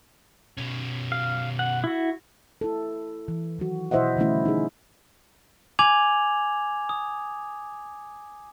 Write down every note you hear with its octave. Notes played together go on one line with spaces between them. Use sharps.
B2 C#4
F5
F#5
E4 F#4
E4 A4
E3
D#3 F#3 F#4
B2 E4 C5 D#5 E5 F#5
D3 E3 G3 A3 C#4 E4
D#4 G#4
G#5 D6 G#6 F7 F#7
D#6